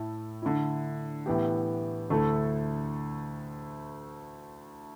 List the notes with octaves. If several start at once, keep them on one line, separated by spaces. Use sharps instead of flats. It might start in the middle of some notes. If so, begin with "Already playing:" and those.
Already playing: A2 A3 E4 A4
D3 A3 E4
A2 E3 B3 G4
D2 D3 A3 E4 A4